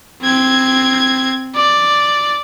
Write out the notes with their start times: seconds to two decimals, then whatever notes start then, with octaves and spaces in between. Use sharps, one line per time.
0.22 C4 G#6
1.56 D5